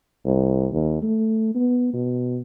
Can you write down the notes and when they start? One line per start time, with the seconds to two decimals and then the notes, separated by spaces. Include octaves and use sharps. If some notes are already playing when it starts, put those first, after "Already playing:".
0.25 C2
0.71 D#2
1.02 A3
1.55 B3
1.93 B2